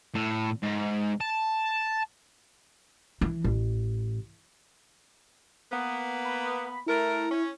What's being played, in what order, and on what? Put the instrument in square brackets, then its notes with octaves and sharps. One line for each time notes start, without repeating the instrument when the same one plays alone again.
[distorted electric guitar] A2
G#2
A5
[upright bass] E3
A1
[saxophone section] A#3 B3
[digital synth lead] B5
[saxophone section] A3 A#4 [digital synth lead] E4
[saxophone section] C#4